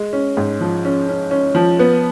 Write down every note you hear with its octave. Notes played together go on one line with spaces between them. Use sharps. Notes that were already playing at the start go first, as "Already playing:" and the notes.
Already playing: G#3
C#4
G#2
F3
C#4
C#4
C#4
F3
B3